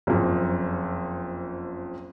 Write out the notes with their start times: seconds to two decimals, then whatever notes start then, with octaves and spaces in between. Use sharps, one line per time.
0.07 F#1 F2